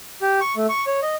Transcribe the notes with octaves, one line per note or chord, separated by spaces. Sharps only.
G4
C#6
A3
C#6
C#5
D#5